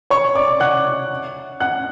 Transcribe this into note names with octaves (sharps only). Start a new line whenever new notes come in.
C#5 C#6
D5 D6
F#5 F#6
F#5 F#6